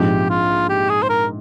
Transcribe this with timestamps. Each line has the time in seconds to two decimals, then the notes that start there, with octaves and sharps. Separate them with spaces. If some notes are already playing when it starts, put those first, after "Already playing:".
Already playing: A#1 G#2 F3 C4 D#4 G4
0.30 F4
0.69 G4
0.90 G#4
1.03 C5
1.09 A#4